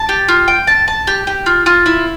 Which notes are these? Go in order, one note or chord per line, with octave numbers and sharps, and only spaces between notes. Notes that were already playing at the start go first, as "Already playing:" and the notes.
Already playing: A5
G4
F4
G5
A5
A5
G4
G4
F4
F4
E4